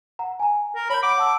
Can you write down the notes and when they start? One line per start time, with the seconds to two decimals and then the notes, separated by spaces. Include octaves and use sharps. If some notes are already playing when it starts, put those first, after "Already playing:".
0.19 F#5 A#5
0.40 G#5 A#5
0.75 A#4
0.90 C#5 A#5 B5 G6
1.03 F#5 D6 D7
1.18 F#5 A5 E6